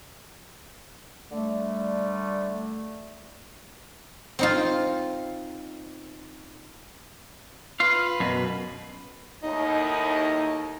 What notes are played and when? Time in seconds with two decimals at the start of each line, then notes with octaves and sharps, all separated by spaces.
1.31 D3 G3 A3
4.39 C4 D#4 F4
7.80 F4 B4 F5
8.20 F#2 B2
9.43 D#2 A2 D#4